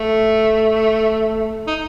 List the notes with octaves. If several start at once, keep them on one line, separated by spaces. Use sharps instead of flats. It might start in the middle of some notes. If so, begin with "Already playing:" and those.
Already playing: A3
D#4